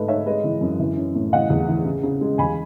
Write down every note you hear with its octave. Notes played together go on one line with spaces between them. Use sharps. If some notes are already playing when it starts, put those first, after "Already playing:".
Already playing: G#2 G#3 A3 B4 D#5
D#4 C#5 E5
G#3 B4 D#5
E3
F#2
E3
C#4
A2
E3 D#5 F#5
E2
E3
C#3
C#3
G#3
E2 G#5 B5